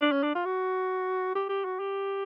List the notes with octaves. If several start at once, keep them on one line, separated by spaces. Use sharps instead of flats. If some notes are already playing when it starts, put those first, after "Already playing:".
D4
C#4
D4
F4
F#4
G4
G4
F#4
G4